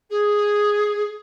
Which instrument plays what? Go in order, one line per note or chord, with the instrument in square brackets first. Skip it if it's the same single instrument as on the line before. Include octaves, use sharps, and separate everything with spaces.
[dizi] G#4